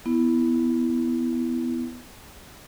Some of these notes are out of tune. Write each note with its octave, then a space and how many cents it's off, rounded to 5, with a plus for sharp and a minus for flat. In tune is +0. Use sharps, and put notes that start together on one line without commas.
B3 +5 E4 +0